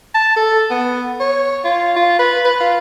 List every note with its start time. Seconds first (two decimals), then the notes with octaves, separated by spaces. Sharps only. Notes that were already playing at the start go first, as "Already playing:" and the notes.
0.14 A5
0.36 A4
0.70 B3
1.20 C#5
1.64 F4
1.96 F4
2.19 B4
2.45 B4
2.60 F4